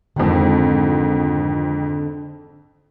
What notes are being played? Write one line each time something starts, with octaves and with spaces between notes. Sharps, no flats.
F2 G#2 D3 D#3 C4